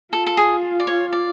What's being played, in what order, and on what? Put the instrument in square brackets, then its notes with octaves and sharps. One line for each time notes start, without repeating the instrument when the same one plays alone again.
[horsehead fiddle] F4 [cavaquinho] A4
[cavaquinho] A4
G#4
D5
C#5
D5